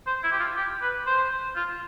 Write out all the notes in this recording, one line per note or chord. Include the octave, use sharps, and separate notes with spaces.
C5
E4
G4
F4
G4
B4
C5
F4